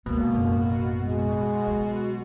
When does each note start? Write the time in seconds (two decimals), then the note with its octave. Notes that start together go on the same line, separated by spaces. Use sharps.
0.06 D2 B2 G#3 A#3
0.34 A1 F#2
1.02 G#3
1.67 F#3